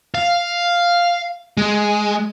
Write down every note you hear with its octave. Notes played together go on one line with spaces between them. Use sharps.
F5
G#3